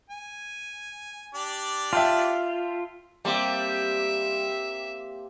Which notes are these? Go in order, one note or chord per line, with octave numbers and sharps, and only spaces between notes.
G#5
D4 G4 D5
F4 E5 G5 A5
G3 A#3 C4 G4 E5